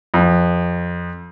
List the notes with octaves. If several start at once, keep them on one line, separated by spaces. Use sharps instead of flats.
F2